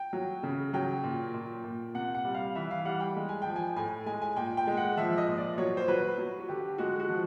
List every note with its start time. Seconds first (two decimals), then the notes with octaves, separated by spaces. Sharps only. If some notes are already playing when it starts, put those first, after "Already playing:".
Already playing: G5
0.13 F#3
0.43 C#3
0.73 F#3 G5
1.04 A#2
1.34 A#2
1.64 A#2
1.94 C3 F#5
2.15 F#5
2.25 G3
2.35 F5
2.55 E3 E5
2.71 F5
2.85 G3 F#5
3.00 G5
3.16 G#3
3.29 G#5
3.42 F3 G5
3.56 G#5
3.76 A2 G#5
4.06 G#3 G#5
4.22 G#5
4.36 A#2 G5
4.57 G5
4.67 G#3
4.77 F#5
4.97 F3 E5
5.18 D#5
5.28 A#2
5.38 D5
5.58 F#3 C#5
5.77 C5
5.88 F#3 B4
6.18 F#3
6.40 F#4
6.49 D3 G4
6.78 G#3 F#4
7.00 F#4
7.09 F3